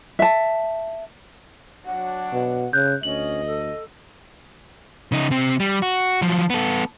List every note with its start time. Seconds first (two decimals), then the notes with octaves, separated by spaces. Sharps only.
0.19 E5 A5
1.86 F#3 D4 F#5
2.33 B2
2.73 C#3 F#6 G6
3.03 D2 C#4 D#5 F#7
3.46 A4
5.12 C#3 D#4
5.30 C3 C4
5.60 G3
5.82 F#4
6.22 F3 F#3
6.50 B3 A4